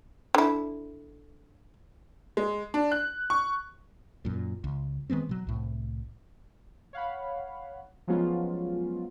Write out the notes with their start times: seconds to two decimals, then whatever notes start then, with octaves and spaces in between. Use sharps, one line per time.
0.35 D3 E4
2.37 G#3
2.74 D4
2.92 F#6
3.30 C#6
4.25 F#2 A#2
4.64 C#2
5.10 D#3 G#3 B3 C4
5.29 B2 F#3
5.47 C2 A2
6.93 C#5 F5 F#5 B5
8.07 F3 F#3 G#3 B3 C#4 F4